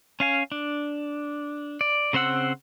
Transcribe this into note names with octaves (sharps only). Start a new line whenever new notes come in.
C#4 F5 G#5
D4
D5
C#3 C4 C5 F#5 E6